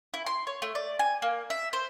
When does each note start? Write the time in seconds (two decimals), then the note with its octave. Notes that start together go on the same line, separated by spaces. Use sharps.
0.14 E4
0.26 C6
0.47 C#5
0.62 A3
0.75 D5
0.99 G#5
1.22 A#3
1.50 E5
1.73 C5